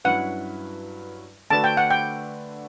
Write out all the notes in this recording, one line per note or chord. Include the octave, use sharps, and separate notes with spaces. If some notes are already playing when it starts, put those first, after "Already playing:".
G2 F#3 C#4 E4 B4 F#5
D3 A3 D4 F#4 B4 A5
G5
F#5
G5